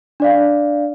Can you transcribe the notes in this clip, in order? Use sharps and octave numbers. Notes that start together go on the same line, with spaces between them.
D4 D5 F5